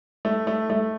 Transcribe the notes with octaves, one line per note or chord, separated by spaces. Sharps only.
A3
A3
A3